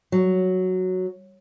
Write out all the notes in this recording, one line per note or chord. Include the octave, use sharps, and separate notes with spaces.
F#3